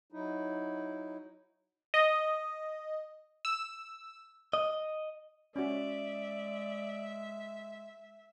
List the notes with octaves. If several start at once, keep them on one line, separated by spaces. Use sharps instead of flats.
F#3 D#4 E4
D#5
E6
D#5
G#3 C#4 F#4 D5 E5